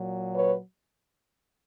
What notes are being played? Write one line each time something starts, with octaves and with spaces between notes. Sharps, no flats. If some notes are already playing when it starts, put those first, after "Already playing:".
Already playing: A#2 F#3
B4 C#5